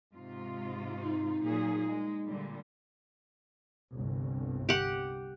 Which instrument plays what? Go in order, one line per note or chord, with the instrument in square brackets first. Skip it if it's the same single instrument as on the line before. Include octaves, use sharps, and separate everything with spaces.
[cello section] G#2 C3 F4
[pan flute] D#4
[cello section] A#2 F#3 G#4
G#3
A#2 D3 G3
[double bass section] G1 C2
[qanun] G4 F#5